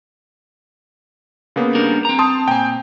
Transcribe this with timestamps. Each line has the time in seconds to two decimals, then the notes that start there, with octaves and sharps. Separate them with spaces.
1.56 C#3 A#3 B3
1.75 G3 D4 A#4
2.05 C4 A#5
2.19 A5 C6 D#6
2.48 A#2 C4 G5 G#5